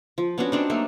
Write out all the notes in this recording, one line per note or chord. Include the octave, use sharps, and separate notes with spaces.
F3
B3 C#4 D4 F#4
C4 D4 D#4
F#3 A3 A#3